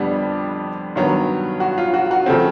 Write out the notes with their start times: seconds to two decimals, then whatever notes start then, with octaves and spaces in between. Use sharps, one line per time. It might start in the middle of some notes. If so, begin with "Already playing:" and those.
Already playing: F2 D3 G3 B3 D4 G4
0.95 G2 D#3 F#3 B3
1.60 F#4
1.78 F4
1.94 F#4
2.11 F#4
2.26 C#3 F3 A3 C4